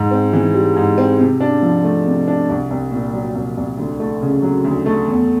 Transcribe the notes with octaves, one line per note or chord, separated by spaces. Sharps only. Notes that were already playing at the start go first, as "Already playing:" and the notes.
Already playing: G#2
C4
E3
G3
G#2
C4
C3
D4
F3
A3
C3
D4
C2
C2
A#2
F#3
C2
C2
D2
A3
C#3
F#3
D2
A3
E2